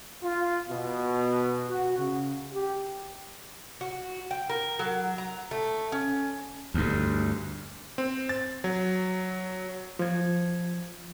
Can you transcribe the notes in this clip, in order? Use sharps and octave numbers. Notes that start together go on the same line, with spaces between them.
F4
B2
F#4
C#3
G4
F#4
G5
A#4
F#3
A#5
A3
C#4
D2 G2
C4
A6
F#3
F3 G#6